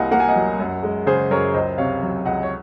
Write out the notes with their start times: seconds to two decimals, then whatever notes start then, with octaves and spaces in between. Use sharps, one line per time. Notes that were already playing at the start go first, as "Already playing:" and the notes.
Already playing: C2 A#3 D#5 F5 F#5 G#5
0.11 A#3 F#5
0.20 G#5
0.29 D#5 F#5
0.35 F#3
0.59 F#2
0.83 G#3
1.06 C#3 G#4 C5
1.30 F#2 A#4 C#5
1.54 C#2 C5 D#5
1.78 C3 C#5 F5
2.02 F#3
2.25 C#2 D#5 F#5
2.43 C#5